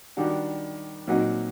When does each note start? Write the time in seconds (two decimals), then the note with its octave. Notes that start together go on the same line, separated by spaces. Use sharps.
0.17 D#3 G3 D4 F#4
1.07 A#2 F#3 C4 D#4 F#4